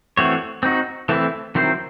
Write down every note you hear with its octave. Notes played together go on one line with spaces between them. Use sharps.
E3 A3 C4 F#4 C#5
C4 D#4 F#4
E3 A3 C4 E4
D#3 F#3 C4 E4 C5